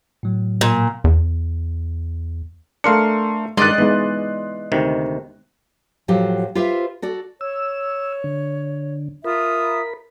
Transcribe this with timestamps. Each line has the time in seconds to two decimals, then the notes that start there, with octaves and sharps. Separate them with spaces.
0.23 A2 F#3
0.61 A#2
1.04 E2
2.84 A3 D4 A#4 F5 C6 C#7
3.57 G2 D#3 G#3 D5 D#5 C6 F#6
3.78 E3 G#3 B3 D#4
4.72 D2 C3 D#3
6.08 A2 F3 F#3 G4
6.55 F4 G4 B4 C5 E5
7.02 F#4 A4 D5
7.41 C#5 E6
8.24 D3
9.24 F4 A#4 E5 B5 D#6